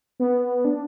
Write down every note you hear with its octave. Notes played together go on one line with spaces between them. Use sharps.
B3
D4